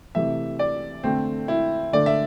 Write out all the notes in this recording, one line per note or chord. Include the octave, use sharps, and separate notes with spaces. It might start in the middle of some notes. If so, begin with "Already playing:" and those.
C3 E3 A3 E5
D5
D3 A3 C4
E4
D3 A3 D5
E5